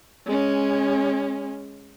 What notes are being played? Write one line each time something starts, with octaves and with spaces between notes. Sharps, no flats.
G#3 C#4